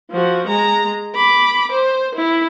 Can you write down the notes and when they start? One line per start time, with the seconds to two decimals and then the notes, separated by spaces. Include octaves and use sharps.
0.11 F3 F#4
0.47 G#3 A#5
1.15 B5 D6
1.72 C5
2.15 E4